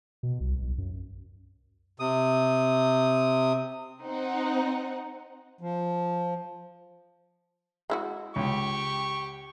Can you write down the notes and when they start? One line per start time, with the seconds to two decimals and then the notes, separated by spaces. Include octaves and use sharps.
0.23 B2
0.40 C2
0.62 B1
0.78 F#2
2.00 C3 D#6
4.02 C4 D#4 F#5
5.61 F3
7.90 G#3 E4 F#4
8.36 C#2 G4 C#6